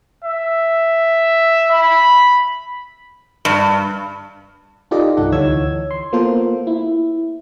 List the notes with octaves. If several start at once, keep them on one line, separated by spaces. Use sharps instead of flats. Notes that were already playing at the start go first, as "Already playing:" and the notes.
E5
B5
G2
D#4 F4 G4 A4 D5 D#5
C2 G2 D#4 A4 F#5
D2 E3 C#5 E6 G#6
C6
A#3 B3 F4 A4 A#4 C5
E4